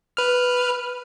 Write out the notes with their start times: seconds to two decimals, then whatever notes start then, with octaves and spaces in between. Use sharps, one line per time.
0.17 B4 F6